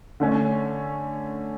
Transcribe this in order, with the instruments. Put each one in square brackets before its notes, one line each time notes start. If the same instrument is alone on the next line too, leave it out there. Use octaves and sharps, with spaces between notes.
[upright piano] D3 A3 C#4